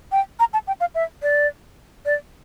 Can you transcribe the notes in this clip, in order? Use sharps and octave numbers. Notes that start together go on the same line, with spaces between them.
G5
A#5
A5
G5
F5
E5
D5
D5